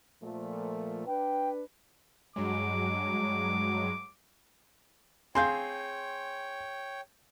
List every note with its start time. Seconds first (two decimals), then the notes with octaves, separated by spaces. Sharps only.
0.23 A#2 F3 A3
1.07 D4 B4 G5
2.36 G2 F#3 G#3 D6
5.35 C4 G#4 C#5 F5 G5 G#5 C6 G6